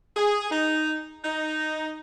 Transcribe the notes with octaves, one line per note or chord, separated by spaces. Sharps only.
G#4
D#4
D#4